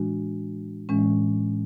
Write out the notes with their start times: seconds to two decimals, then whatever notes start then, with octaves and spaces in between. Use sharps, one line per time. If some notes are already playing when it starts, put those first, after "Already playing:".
Already playing: A2 E3 G#3 D4 F#4
0.89 A2 E3 G#3 C#4